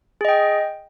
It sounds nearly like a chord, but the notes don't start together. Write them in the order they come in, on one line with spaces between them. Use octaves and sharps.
G#4 D#5 G5